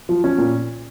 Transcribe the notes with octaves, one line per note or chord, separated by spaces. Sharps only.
F3
F3 C#4
A#2